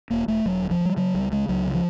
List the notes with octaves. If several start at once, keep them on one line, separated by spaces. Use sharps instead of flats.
E1 A#3
E1 A3
E1 F#3
D2
F3
D2
G3
C#3 F#3
C#2 G3
C#3 G#3
C#2 F#3
C#3
F3